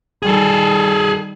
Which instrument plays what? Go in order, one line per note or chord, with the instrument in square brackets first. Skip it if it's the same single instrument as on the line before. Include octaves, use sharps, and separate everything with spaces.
[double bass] D#3 G3 [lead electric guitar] G#4 A4